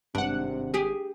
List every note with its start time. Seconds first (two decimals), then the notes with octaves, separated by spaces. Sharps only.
0.15 G#1 G2 C3 D4 F#5
0.74 G4 G#4